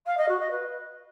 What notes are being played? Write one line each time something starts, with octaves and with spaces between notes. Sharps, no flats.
F5
D#5
F#4
D#5
B4